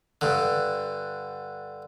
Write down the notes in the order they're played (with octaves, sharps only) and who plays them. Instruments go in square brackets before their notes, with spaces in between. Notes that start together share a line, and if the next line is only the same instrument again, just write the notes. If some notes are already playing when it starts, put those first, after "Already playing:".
[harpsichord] G2 D3